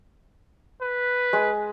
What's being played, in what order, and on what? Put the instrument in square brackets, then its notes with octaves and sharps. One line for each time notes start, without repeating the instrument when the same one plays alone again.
[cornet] B4
[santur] G#3